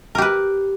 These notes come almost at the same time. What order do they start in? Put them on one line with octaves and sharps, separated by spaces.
A#4 G4 B4